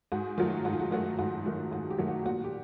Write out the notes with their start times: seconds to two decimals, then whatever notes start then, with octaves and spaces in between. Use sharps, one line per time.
0.12 G#2 F#4
0.38 D#3 F#3 A3 F4
0.65 G#2 F#4
0.73 F4
0.80 F#4
0.91 D#3 F#3 A3 F#4
1.19 G#2 F#4
1.46 D#3 F#3 A3
1.72 G#2 F#4
1.90 G4
1.98 D#3 F#3 A3
2.08 F#4
2.26 A#2 F#4
2.44 G4